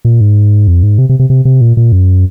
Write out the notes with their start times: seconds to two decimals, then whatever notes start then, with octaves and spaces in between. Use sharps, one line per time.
0.05 A#2
0.21 G#2
0.68 F2
0.83 G#2
0.98 C3
1.09 C3
1.19 C3
1.30 C3
1.45 C3
1.61 A#2
1.77 A#2
1.92 F#2